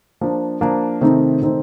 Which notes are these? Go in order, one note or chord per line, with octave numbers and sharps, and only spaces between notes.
F3 A#3 D4
F3 A#3 D4
C3 D#3 A3 C4 D#4
C3 D#3 A3 C4 D#4